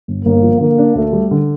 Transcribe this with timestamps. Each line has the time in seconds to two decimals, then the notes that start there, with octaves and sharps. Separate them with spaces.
0.08 G1
0.25 G1 A#3
0.42 F3
0.60 D3 A#3
0.78 D4
0.95 D2 A3
1.13 G3
1.31 D3